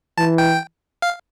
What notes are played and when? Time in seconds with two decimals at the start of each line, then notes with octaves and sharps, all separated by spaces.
0.18 E3 A5
0.38 G5
1.02 F5